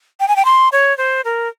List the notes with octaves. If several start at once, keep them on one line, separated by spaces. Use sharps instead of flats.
G5
G#5
G5
C6
C#5
C5
A#4